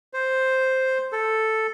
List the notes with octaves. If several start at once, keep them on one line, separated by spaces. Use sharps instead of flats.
C5
A4